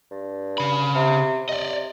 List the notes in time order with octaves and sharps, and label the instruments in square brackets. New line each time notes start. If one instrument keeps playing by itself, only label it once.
[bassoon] G2
[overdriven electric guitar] C#3 B5
[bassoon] C3
[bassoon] C3 [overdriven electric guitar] D5 D#5